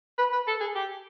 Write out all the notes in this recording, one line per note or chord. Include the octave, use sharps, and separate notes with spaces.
B4
B4
A4
G#4
G4